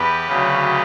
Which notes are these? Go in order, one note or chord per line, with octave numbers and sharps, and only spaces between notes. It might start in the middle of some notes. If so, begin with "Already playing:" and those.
Already playing: E2 G4 B4
D2 C#3 F#3